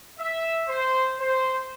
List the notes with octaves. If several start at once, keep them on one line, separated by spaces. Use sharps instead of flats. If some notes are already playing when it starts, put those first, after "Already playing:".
E5
C5
C5